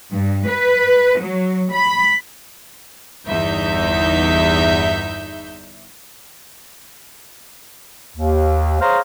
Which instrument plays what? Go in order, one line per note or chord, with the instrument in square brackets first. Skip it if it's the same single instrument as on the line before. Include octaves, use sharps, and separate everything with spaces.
[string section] G2
B4
F#3
B5
G1 E2 D#4 E5 G6
[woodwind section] D#2
G#4 C5 C#5 F5 A#5